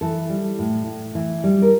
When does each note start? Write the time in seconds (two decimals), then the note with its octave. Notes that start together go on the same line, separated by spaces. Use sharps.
0.01 E3 A4
0.29 G3
0.59 A2
0.87 A2
1.15 E3
1.44 G3
1.62 A#4